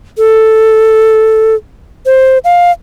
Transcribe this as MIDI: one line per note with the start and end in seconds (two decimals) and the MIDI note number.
0.18 1.55 69
2.06 2.38 72
2.45 2.71 77